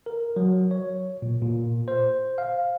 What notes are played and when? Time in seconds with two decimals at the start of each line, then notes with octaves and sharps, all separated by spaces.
0.06 A#4
0.36 F#3
0.71 C#5
1.22 A#2
1.42 A#2
1.88 C5
2.38 F5